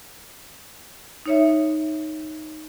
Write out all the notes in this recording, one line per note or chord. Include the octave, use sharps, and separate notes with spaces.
D#4 C#5 E5